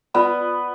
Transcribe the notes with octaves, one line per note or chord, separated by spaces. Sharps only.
B3 F4 B4 D5 G#5 B5